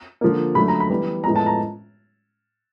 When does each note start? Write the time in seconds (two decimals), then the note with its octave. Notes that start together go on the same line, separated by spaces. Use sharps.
0.21 D3 F3 A#3
0.55 D3 F#3 A3 B5
0.68 A#5
0.80 B5
0.90 E3 G3 B3
1.24 A2 F3 G#3 B3 A#5
1.36 A5
1.46 A#5